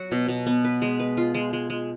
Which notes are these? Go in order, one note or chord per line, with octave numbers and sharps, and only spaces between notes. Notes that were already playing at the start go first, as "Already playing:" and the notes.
Already playing: F#3 F#4
B2
B2
B3
B4
G#3
B4
F4
G#3
G#3
G#3